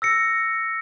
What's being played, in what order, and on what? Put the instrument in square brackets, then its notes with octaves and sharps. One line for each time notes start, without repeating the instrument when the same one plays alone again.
[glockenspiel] E6 A#6 C#7